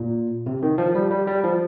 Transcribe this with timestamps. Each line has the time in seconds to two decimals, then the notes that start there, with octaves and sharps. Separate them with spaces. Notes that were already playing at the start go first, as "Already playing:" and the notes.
Already playing: A#2
0.46 C3
0.63 D#3
0.78 F3
0.95 G3
1.11 G3
1.27 G3
1.44 F3